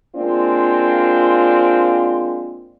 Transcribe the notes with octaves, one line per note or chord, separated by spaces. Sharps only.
G#3 A#3 C4 D4 F4